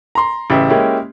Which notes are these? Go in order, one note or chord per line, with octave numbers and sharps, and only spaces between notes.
A#5 C6
A1 C#3 G4 E5
G#3 A#3 C#4 E4 G4